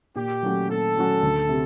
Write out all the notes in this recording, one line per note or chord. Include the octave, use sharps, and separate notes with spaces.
A#2 G4
F#3 A3 C#4 F#4
A#2 A4
F#3 A3 C#4 F#4
D2
C3